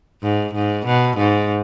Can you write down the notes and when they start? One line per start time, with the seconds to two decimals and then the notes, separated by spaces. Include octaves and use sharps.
0.23 G#2
0.54 G#2
0.86 B2
1.17 G#2